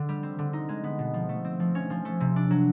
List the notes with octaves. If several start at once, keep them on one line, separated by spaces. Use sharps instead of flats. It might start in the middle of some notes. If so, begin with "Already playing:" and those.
Already playing: D3
G3
C4
D3
D#4
G#3
B3
B2
F3
A3
C4
F3
C#4
F3
A3
C3
D4
F#3